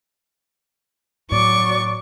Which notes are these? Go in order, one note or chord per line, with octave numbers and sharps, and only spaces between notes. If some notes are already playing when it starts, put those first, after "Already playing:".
A2 F#3 D5 C#6